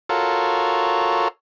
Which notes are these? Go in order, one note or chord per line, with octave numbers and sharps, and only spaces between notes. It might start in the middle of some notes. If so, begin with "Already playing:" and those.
F4 F#4 A4 A#4 C#5